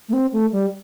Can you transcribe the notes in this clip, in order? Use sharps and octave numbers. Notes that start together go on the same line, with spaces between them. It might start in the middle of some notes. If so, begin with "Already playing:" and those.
A3
C4
A3
G3